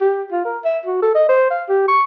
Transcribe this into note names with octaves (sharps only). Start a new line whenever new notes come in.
G4
F4
A#4
E5
F#4
A4
D#5
C5
F5
G4
C#6